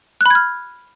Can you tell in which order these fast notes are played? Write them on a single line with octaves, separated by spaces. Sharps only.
F#6 B5 G#6 F6